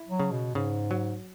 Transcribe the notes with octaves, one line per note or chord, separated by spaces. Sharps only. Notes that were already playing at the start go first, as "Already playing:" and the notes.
Already playing: E4
F#3
C#3
B2
G#2 C#3
F#3